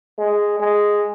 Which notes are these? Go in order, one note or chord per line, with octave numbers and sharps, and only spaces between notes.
G#3
G#3